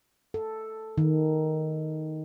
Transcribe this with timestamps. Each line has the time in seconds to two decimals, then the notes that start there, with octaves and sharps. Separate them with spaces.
0.34 A4
0.98 D#3